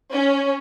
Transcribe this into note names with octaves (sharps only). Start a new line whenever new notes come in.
C#4